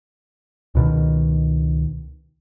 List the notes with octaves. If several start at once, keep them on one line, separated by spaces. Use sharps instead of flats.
C#2 B2 D#3